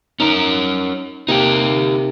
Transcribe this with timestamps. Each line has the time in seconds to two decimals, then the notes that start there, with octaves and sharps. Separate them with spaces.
0.20 C#4 D#4 A#4 F5
1.28 C3 A#3 D#4 G4